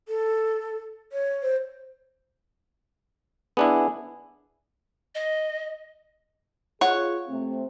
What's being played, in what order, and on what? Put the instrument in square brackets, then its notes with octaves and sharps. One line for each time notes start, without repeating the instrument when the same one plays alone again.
[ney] A4
C#5
C5
[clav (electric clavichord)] B3 D4 E4 [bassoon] G#4
[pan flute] D#5
[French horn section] F4 G#4 [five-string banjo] C#5 F#5
[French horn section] C3 A3 C4